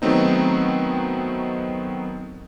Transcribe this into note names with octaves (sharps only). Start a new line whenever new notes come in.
D#3 F#3 A3 B3 C4 D#4